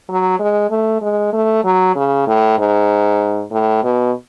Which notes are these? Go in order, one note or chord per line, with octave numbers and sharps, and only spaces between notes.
F#3
G#3
A3
G#3
A3
F#3
C#3
A2
G#2
A2
B2